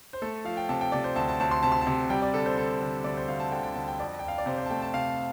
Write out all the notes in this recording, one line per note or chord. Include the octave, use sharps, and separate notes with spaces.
C5
A3 A4
F3 F5
G5
C3 A5
G5
C3 D5
C5
D2 A5
A5
D2 A5
C6
C3 A5
C6
A5
C3
G3 G5
D5
D3 A4
C5
D3 A4
D3
D2 D5
C5
D2 F5
A5
D3 G5
G5
D2 A5
G5
F2 D5
F2 G5
F5
D5
C3 C5
C5
A5
A3 G5
A5
C3 F5